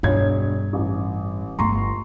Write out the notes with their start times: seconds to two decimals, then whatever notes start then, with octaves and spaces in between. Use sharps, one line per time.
0.03 E1 G2 C#5 G#6
0.73 A1
1.59 G1 A3 A#5 C6 C#6